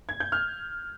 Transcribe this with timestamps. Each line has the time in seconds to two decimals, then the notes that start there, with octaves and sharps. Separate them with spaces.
0.09 G#6
0.20 G6
0.32 F6